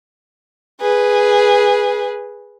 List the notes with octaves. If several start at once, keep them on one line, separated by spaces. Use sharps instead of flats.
G#4 B4